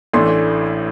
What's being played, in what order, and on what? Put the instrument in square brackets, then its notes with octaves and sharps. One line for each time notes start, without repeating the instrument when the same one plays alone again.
[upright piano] A1 A2 E3 A3 D4 C6